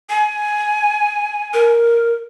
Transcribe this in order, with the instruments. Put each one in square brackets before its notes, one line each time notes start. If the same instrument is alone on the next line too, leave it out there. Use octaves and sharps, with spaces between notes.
[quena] G#5
[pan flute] A#4